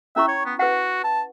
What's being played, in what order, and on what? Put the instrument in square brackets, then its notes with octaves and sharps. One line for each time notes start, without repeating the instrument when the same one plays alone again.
[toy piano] C#4 E4 C#6 [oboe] E5
[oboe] C#5
B3
[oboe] F#4 [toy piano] B4 F#5
[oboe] A5